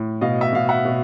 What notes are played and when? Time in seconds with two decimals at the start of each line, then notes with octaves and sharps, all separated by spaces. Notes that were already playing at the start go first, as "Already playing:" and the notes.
Already playing: A2
0.21 B2 D#5 F5
0.41 E5
0.53 B2 F5
0.69 E5 F#5
0.85 B2